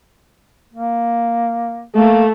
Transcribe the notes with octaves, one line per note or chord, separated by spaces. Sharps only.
A#3
A3 A#3